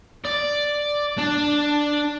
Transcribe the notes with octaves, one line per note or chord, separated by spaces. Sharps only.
D5
D4